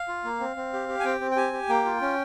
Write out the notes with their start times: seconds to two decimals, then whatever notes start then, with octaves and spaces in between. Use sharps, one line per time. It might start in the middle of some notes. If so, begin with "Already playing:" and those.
Already playing: F5
0.08 F4
0.25 A#3
0.40 C4
0.56 C4
0.73 G4
0.89 G4
1.00 G#5
1.04 C4 G5
1.21 C4
1.31 G5
1.36 G4 G#5
1.53 G4
1.69 A#3 G5
1.85 F4
2.02 C#4